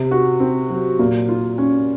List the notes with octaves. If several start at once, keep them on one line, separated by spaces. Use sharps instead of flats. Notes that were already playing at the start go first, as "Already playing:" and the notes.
Already playing: C3
F#4
C4
F#3
A#2
F4
C#4